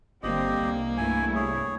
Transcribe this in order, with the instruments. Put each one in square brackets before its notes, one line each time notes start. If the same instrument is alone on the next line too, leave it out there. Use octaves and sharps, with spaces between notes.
[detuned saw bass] G1 [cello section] D3 G3 C4 [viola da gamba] A#3 [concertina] G4 D#5
[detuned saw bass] C2
[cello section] G2 A3 E4 [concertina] G#5
[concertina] G#4 C#5